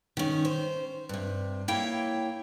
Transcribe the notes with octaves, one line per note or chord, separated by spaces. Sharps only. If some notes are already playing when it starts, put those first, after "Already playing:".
D#3 C#4
C5
G2 C3
A#3 E4 C#5 G5